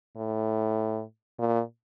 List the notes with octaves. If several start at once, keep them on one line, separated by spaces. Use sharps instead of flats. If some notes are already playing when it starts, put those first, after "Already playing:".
A2
A#2